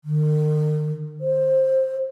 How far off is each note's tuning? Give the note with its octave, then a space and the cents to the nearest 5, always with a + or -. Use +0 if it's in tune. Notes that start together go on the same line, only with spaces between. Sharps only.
D#3 -40
C5 +15